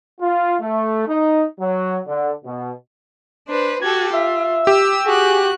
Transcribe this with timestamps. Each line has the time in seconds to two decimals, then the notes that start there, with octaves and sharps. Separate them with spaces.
0.21 F4
0.60 A3
1.08 D#4
1.59 F#3
2.07 D3
2.45 B2
3.48 D4 B4 C5
3.81 F#4 G4 A4 G#6
4.13 F4 E5
4.67 G4 E6
5.06 F#4 G#4 F#6